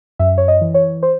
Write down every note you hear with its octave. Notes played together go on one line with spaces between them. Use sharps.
F#2 E5
C#5
D#5
E3
C#5
C5